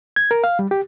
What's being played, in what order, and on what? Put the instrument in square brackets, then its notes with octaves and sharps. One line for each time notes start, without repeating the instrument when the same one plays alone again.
[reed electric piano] G#6
A#4
F5
G3
G4